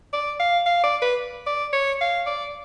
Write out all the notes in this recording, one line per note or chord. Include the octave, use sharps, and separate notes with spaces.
D5
F5
F5
D5
B4
D5
C#5
F5
D5